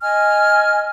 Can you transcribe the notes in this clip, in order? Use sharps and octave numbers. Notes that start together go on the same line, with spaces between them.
D#5 G#5 F6